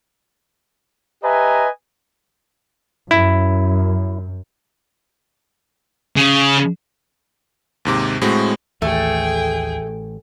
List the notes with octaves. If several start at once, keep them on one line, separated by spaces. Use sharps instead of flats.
G4 B4 D#5 E5 G#5 A#5
F#2 E4
C#3
D#2 G#2 C3 D6
A2 G#3 C4 F#4
A1 D#2 A3 G#4 G5